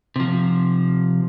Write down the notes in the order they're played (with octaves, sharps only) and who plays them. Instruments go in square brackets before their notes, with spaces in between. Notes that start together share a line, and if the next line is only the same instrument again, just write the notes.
[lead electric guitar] C3 F3